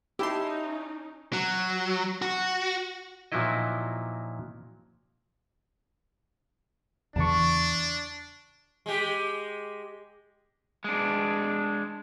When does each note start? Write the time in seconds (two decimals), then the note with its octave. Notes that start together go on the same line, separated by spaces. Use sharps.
0.19 C#4 D#4 E4 G4 A5 C6
1.33 F#3
2.22 F#4
3.32 A#2 F3 F#3 D#4 E4 D#5
7.16 E2 C#3 E3 D4 A5 C#6
8.86 G#3 G4
10.84 G#3 D4